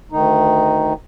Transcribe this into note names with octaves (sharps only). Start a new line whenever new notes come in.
D2 D#3 D#4